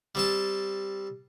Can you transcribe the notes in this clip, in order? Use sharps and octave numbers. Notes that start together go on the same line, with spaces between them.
G3 C4 A5